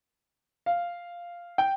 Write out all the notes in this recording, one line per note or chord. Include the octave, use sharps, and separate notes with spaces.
F5
G5